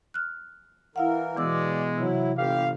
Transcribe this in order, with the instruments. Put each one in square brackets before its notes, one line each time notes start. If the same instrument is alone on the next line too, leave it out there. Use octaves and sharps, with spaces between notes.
[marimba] F6 F#6
[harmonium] E3 A#4 [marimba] E4 F5 F#5
[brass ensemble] B2 G#3 [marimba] E3 D6 E6 [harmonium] D5
[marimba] C3 [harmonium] F#3 E4
[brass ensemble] G1 F5 [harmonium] G4